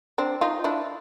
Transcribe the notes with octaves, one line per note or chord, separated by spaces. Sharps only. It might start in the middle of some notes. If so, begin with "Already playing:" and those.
C4 D4
D#4 F4
D4 E4